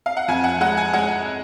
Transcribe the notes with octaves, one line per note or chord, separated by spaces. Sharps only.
F5
F#5
F2 G#5
F#5
G#3 F#5
G#5
G#3 F#5